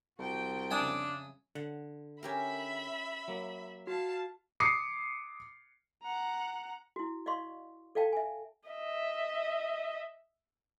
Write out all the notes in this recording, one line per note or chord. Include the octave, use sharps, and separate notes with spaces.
C2 F#4 G5
F2 C#3 D4 E5 G#5 D#6
D3 F#5
C#4 G4 A#4 E5 B5
F#3 A#3
F#4 F5 A5
D6 D#6 C7 C#7
F#5 A#5
E4 F#4
D5 D#5 F5 C6 C#6
A4 D5 F5 G5 A5
E5 G#5
D#5 E5